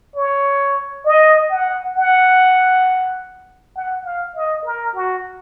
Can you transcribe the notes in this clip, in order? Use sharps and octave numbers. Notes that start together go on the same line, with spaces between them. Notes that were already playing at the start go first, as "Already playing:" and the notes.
C#5
D#5
F#5
F#5
F#5
F5
D#5
A#4
F#4